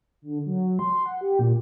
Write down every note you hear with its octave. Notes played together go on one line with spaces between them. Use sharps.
D3
F#3
C6
F#5
G4
A#2